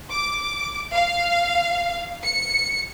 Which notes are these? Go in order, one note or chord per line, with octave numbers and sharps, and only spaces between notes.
D6
F5
C#7